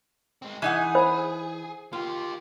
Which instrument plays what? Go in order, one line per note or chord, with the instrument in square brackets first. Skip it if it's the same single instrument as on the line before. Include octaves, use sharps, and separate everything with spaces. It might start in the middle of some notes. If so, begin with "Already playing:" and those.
[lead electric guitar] G#3 C4
[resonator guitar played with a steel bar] E3 D#4 F#5 [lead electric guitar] G#4
[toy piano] C5 B5
[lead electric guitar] A#3 G4 [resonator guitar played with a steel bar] F4